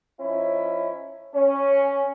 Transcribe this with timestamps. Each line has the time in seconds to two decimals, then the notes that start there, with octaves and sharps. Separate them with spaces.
0.20 F3 C#4 D#4 E4
1.35 C#4